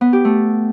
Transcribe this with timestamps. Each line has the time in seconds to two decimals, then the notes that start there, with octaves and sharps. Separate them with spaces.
0.01 B3
0.13 G4
0.25 A3